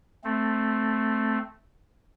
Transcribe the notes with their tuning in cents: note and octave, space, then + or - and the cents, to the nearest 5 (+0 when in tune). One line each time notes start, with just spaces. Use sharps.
A3 +0 C4 +0